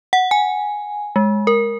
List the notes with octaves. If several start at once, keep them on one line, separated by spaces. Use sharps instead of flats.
F#5
G#5
G#3
A#4